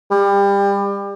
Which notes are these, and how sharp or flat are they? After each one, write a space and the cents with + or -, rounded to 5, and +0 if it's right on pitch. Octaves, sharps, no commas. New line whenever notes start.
G3 +30